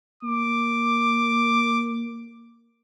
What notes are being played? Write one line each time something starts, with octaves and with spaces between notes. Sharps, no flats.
A#3 D6